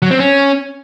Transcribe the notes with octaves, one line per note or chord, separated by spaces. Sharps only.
F#3
C4
C#4